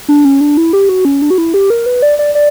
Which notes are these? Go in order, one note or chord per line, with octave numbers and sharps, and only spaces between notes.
D4
C#4
D4
E4
G4
F#4
C#4
D4
F#4
E4
G4
A#4
B4
D5
D5
D5